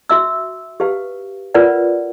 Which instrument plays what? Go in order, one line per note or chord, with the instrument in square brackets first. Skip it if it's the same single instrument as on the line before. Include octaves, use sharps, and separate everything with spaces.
[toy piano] F#4 E5 E6
G4 B4 F5
F4 A#4 B4 D5 F#5